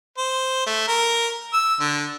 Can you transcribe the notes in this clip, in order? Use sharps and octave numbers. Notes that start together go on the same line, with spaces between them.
C5
A3
A#4
E6
D3